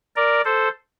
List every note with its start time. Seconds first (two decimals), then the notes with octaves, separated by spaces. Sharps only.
0.16 A#4 D5
0.45 A4 C5